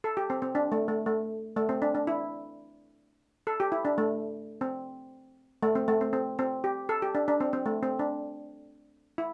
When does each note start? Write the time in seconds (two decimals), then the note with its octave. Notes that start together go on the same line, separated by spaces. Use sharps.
0.04 A4
0.17 G4
0.30 C4
0.42 C4
0.55 D4
0.72 A3
0.88 A3
1.06 A3
1.57 A3
1.69 C4
1.82 D4
1.95 D4
2.07 E4
3.47 A4
3.60 G4
3.72 E4
3.85 D4
3.98 A3
4.61 C4
5.63 A3
5.75 C4
5.88 A3
6.01 C4
6.13 C4
6.39 C4
6.64 G4
6.89 A4
7.02 G4
7.15 D4
7.28 D4
7.40 C4
7.53 C4
7.66 A3
7.83 C4
7.99 D4
9.18 E4